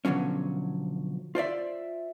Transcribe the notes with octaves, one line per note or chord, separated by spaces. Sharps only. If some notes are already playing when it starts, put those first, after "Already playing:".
B2 D3 F3 F#3 C#4
F4 C5 D5 E5